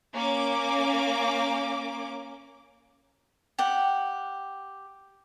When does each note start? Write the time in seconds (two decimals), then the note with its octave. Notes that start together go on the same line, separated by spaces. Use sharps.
0.14 A#3 C#4 D6
3.58 G4 F#5